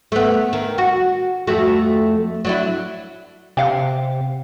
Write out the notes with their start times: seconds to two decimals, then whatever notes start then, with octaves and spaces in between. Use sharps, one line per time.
0.12 A3 B3
0.53 D#3
0.78 F#4
1.47 F2 A3 F#4
2.45 F#3 D4 E4
3.57 C3 G4 F5 F#5